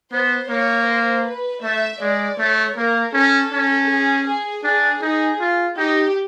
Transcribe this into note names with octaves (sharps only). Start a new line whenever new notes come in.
B3 C5
A#3 C#5
C5
B4
A3 E5
G#3 D5
A3 C#5
A#3 A#4
C#4 A4
C#4
G#4
G#4
D4 G#4
D#4 G#4
F4
D#4 G4